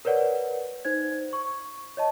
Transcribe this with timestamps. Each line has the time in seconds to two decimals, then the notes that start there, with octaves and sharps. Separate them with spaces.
0.05 A#4 B4 C#5 D5 F#5
0.85 D#4 C5 G#6
1.33 C#6
1.97 C#5 D#5 A5